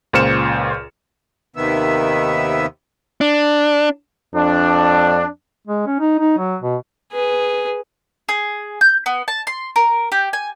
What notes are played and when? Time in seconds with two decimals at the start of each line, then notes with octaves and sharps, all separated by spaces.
0.13 C#2 A#2 C5 F6 C#7 E7
1.56 D#2 C3 D#3 B3 E5
3.21 D4
4.35 F2 D4
5.68 G#3
5.87 C#4
6.00 D#4
6.19 D#4
6.39 F#3
6.62 B2
7.12 G#4 B4
8.29 G#4
8.81 G6
9.06 B3
9.28 A5
9.47 C6
9.76 A#4
10.12 G4
10.33 G#5